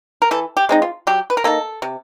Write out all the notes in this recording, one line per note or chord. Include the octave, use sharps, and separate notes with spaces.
A#4
E3 A4
G4
G#3 C4 D#4
F4
F#3 G4
B4
A#4
A#3 D#4 A4
C3